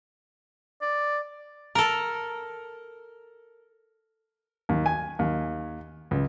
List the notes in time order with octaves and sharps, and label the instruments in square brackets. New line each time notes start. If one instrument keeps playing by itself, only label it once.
[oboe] D5
[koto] A4 A#4
[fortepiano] D#2
G#5
D#2
C#2